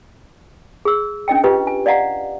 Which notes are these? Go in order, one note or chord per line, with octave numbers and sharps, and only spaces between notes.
G#4 E6
C#4 D4 D#5 G5
C#4 F4 G4 B4 D#5
G#5
D5 D#5 F5 F#5 A#5